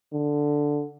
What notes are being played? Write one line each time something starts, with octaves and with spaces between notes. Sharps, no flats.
D3